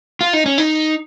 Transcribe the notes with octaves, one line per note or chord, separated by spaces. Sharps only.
F4
D#4
C#4
D#4